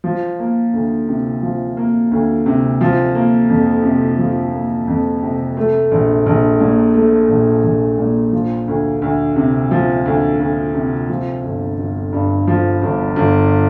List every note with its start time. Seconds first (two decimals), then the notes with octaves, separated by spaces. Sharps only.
0.04 F3
0.39 A#3
0.73 D2
1.08 C3
1.43 F3
1.77 A#3
2.11 D2
2.46 C3
2.81 F3
3.15 A#3
3.49 F2
3.84 C3
4.19 F3
4.53 A#3
4.87 F2
5.22 C3
5.57 A3
5.91 A#1
6.26 A#1
6.60 A#2
6.94 A3
7.29 A#1
7.64 A#1
7.98 A#2
8.32 F3
8.68 D2
9.02 D2
9.36 C3
9.71 F3
10.06 D2
10.40 D2
10.75 C3
11.09 F3
11.43 G1
11.78 G1
12.13 G2
12.47 F3
12.82 G1
13.16 G1